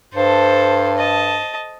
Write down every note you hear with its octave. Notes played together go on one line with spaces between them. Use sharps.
G2 A4 C5
D#5 A5